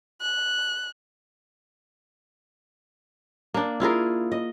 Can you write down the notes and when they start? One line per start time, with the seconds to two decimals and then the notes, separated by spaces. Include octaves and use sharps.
0.22 F#6
3.54 A#3 D4
3.80 E4 F4 G#4 A#4
4.32 D#5